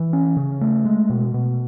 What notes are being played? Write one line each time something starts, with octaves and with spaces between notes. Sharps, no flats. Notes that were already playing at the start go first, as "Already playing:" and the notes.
Already playing: E3
C#4
C#3
A3
G#3
B2
B2